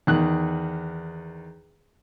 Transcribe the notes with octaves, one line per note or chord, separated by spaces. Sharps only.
E2 D#3 F#6